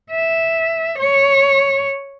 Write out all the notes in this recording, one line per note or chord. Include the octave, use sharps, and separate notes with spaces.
E5
C#5